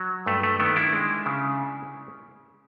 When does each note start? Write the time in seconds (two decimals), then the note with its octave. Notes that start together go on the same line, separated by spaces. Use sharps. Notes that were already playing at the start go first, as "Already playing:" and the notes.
Already playing: F#3
0.26 G2 A3
0.43 A3
0.60 D#3 A3 B3
0.76 D4 E4
0.93 G#3
1.26 C#3